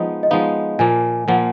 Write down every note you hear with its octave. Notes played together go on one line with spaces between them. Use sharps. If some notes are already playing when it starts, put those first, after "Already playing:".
Already playing: F3 G#3 B3 D#4
D#5
F3 G#3 B3 D#4 F5
A#2 F3 A#3 G#5
A#2 F3 A#3 F#5